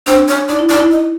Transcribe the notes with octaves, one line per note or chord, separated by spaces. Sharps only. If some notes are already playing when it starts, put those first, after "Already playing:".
D4 C5
C#5
D#4 D5
E4
D#4 D5
E4
D#5